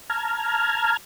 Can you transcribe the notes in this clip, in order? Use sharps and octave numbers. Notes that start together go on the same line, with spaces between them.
A5 A#5 F6 G#6